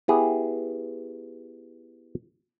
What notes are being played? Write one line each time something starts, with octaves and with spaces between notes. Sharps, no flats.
B3 E4 G4 G#4